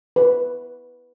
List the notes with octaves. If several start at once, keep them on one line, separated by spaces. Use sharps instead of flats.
B4